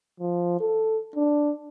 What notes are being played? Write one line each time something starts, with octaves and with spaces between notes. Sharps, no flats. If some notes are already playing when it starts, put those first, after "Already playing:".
F3
A4
D4